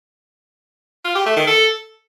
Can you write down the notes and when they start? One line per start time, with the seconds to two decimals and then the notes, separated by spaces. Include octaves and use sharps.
1.04 F4
1.15 G4
1.26 A3
1.37 D#3
1.47 A4